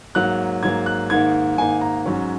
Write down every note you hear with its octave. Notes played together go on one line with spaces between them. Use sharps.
G#2 F#3 A#3 F#6
G#2 F#3 A#3 G#6
F#6
G#2 D#3 A#3 D#4 G#6
G#2 D#3 A#3 D#4 G#5
A#5
G#2 F#3 C#4